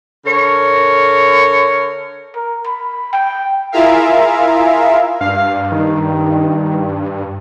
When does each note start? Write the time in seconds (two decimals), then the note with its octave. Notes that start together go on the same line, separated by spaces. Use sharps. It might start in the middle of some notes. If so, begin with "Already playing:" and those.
0.24 D3 A#4 C#5
2.36 A#4
2.67 B5
3.13 G5
3.72 E4 F4 G#4 A#4 E5 F5
5.21 G2 F5
5.72 D#3